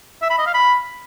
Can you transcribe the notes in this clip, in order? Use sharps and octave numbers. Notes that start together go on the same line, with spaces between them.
E5
B5
D#5
F5
B5